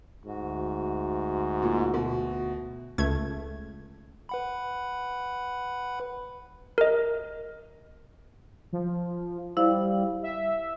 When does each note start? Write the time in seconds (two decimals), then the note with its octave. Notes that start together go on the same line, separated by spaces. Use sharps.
0.25 D2 G#2 F#4
1.62 A#2
1.94 B2
2.98 C#2 A3 G#6
4.29 B4 F#5 B5
6.78 A#4 D#5
8.73 F3
9.57 G3 E4 C5 F5
10.23 E5